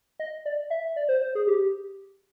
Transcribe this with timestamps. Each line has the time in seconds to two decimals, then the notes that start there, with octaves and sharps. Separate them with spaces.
0.20 D#5
0.46 D5
0.70 E5
0.96 D5
1.09 C5
1.22 C5
1.35 G#4
1.47 G4